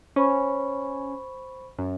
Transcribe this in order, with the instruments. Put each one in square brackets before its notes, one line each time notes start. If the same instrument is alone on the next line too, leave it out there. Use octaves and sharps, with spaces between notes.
[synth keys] C#4 [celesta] C5 B5 C#6
[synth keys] F#2